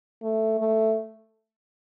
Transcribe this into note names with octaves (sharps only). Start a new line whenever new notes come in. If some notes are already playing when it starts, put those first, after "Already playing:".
A3
A3